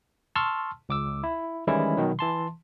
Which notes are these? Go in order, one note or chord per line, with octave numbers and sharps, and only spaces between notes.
A5 C6 C#6 E6 F6
C#2 D6 E6
E4
D#3 E3 G3 G#3 C#4 E4
B2 D#3 F#3
E3 A5 C6